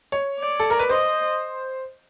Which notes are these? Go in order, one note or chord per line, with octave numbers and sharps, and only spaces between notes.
C#5
D5
A4
A#4
B4
C5 D#5